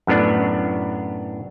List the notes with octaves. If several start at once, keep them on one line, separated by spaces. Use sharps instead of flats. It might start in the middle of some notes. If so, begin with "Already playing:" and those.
F#2 A2 B3 D4